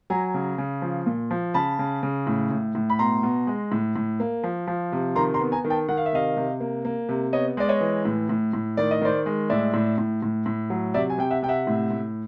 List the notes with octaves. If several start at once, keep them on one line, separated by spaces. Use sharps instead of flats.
F#3 G#5 A#5
C#3
C#3
F3
A#2
F3
C#3 A5 B5
C#3
C#3
A2
A2
A2
B5
B2 A#5 C6
B2
G#3
A2
A2
A#3
F3
F3
C3
D#3 A#5 C6
A#5 C6
B3
G#5 A#5
D#3
G5 A5
D#3 F#5
F5
E5
C3 D#5 F5
C3
A#3
A#3
C3
B3 C#5 D#5
G#3 D5
C#5 D#5
E3
A2
A2
A2
D#3 D5
D#5
D#3 C5 D5
G#3
A2 D5 E5
A2
A2
A2
A2
F#3
C3 D5 E5
G#5
C3 G5
E5 F#5
C3 G5
E5 F#5
A2
A2